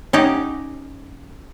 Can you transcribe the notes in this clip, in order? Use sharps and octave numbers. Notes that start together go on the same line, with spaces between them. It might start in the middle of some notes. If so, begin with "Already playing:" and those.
C#4 D#4 G4 F#5